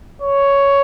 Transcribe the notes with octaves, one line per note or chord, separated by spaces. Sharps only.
C#5